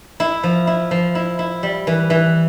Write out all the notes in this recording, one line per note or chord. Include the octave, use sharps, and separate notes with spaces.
E4
F3
E4
F3
E4
E4
G3
E3
E3